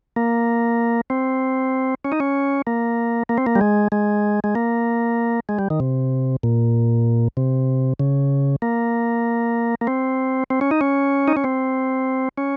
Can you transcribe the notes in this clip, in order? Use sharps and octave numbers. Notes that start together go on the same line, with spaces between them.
A#3
C4
C#4
D#4
C#4
A#3
A#3
C4
A#3
G3
G#3
G#3
G#3
A#3
G#3
G3
D#3
C3
A#2
C3
C#3
A#3
A#3
C4
C4
C#4
D#4
C#4
D#4
C#4
C4
C#4